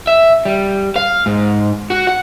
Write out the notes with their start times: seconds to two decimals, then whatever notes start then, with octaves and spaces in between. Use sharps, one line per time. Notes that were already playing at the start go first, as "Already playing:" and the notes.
0.07 E5
0.45 G3
0.96 F5
1.26 G#2
1.90 F#4
2.07 F#5